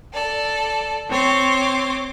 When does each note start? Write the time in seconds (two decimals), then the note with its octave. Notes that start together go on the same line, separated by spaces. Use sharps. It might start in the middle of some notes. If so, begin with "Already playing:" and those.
0.12 A4 D5
1.10 C4 C#5 C6 D6